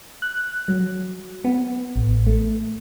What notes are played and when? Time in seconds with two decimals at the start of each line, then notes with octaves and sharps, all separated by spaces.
0.22 F#6
0.68 F#3
1.45 B3
1.96 A1
2.26 A3